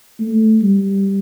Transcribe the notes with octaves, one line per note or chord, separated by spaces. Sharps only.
A3
G3